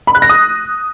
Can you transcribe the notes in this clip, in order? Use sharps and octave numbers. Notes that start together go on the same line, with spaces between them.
B5
F#6
A#6
D#6